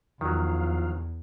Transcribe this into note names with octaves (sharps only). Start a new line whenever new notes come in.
E2 D#3 F3 F#3 F5